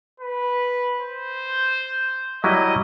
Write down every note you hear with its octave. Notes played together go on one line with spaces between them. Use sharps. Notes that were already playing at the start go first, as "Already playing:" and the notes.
B4
C5
F#3 G3 E4 D#5